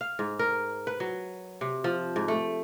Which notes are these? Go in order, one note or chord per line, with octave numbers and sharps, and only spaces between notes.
F5
G#2
A#4
B4
F#3
C3
F3
G#2
A3